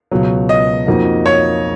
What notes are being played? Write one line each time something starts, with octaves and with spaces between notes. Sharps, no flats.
C#2 B2 F#3
D#5
F2 F3 A#3 D#4 F#4
C#5